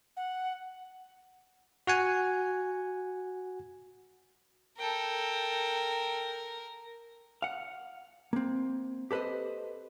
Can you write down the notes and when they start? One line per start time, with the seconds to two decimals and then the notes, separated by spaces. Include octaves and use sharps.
0.17 F#5
1.87 F#4 F#5 G#5
4.79 A4 A#4 G5
7.42 F5 F#5
8.33 A#3 C4
9.11 G4 A4 B4 C5 D#5